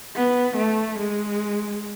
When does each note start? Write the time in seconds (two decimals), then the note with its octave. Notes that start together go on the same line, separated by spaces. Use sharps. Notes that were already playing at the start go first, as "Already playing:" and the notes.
0.16 B3
0.57 A3
0.99 G#3